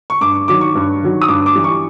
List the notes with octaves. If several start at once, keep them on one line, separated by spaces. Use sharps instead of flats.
C#6
G2 D6
D#3 F#3 D6
C#6
G2
D#3 F#3
D#6
G2 D6
D6
E3 G3
C#6